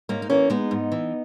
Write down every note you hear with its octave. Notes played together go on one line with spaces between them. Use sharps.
G#2 A#3 C#4
D#4
E3 A#3 C#4
G#3 B3 D#4
G#2
E3